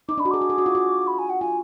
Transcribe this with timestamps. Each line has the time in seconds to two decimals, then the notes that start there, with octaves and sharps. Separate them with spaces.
0.09 D#4 D6
0.18 D4 B5
0.25 F#4
0.31 G#4 D6
0.41 F#4
0.50 G#4
0.58 F#4
0.66 F4
0.75 F#4
1.07 B5
1.19 G#5
1.30 F#5
1.41 F4 G#5